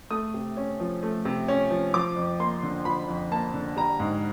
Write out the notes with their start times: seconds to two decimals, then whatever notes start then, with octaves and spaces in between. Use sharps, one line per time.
0.10 A3 D#6
0.34 C3
0.57 C#4
0.80 F3
1.03 A3
1.25 C3
1.48 C#4
1.70 F3
1.94 F3 D6
2.16 F2
2.39 A#3 C6
2.63 D3
2.85 F3 B5
3.08 F2
3.31 A#3 A5
3.54 D3
3.76 G3 A#5
4.00 G#2